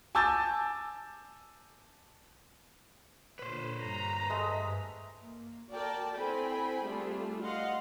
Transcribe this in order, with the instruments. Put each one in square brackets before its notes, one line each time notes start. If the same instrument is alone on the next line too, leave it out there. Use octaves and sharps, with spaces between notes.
[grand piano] G#5 A5 D6 E6 G6 A6
[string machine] A#2 D3 [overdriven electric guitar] B4 C5
[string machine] G2 B6 [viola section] A#5
[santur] G#3 A3 E5
[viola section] A#3
F#4 A#4 D5 G5 A5
C4 E4 A4 G5 G#5 B5
G3 A3 D4 F4 G#4
D#5 F5 F#5 C6